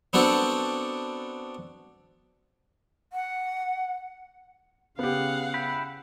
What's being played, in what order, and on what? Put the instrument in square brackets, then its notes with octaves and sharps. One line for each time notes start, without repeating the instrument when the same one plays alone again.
[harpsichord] B3 C4 D4 F#4 A4
[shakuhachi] F#5
[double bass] C#3 [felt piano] B3 G4 [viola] F5 F#5
[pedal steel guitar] E4 G5 B5